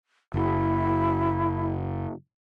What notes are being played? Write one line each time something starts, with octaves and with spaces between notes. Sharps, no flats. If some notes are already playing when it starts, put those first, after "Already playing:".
F#1 E4